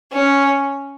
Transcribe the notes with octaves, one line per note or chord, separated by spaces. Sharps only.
C#4